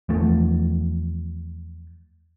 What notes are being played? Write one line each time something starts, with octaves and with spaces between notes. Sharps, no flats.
E2 F3 A3